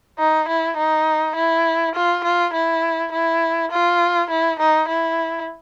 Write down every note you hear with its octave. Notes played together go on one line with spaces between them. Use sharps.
D#4
E4
D#4
E4
F4
F4
E4
E4
F4
E4
D#4
E4